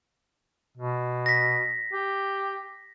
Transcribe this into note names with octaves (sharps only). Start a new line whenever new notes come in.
B2
A#6 B6
G4